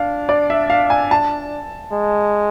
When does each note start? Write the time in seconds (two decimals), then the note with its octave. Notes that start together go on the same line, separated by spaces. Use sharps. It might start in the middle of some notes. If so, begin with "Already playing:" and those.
Already playing: D4 F5
0.29 D5
0.50 E5
0.70 F5
0.90 G#5
1.11 A5
1.92 G#3